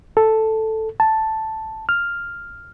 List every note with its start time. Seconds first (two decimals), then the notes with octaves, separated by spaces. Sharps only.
0.17 A4
1.00 A5
1.89 F6